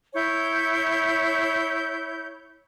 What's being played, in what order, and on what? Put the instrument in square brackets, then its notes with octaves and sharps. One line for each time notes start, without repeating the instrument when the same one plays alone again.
[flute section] E4 C#5 G6